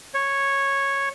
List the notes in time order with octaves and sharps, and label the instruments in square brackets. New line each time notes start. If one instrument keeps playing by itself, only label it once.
[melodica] C#5